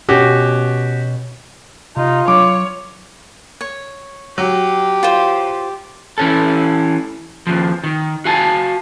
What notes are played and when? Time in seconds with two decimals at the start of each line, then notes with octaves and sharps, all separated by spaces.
0.09 B2 C#4 F#4 G4
1.97 C3 D#4 F4
2.28 F#3 C#5 D6
3.61 C#5
4.38 F#3 G4
5.03 F4 C5
6.18 E3 C#4 A4
7.47 D#2 F3
7.84 D#3
8.25 F#4 F5 G#5 A5